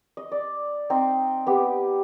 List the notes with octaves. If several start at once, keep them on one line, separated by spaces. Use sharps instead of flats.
D#5
D5
C4 D#4 G5 C6
B3 G4